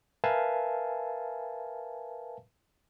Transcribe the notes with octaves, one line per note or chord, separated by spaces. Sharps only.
A#4 B4 E5 F5 G#5 A5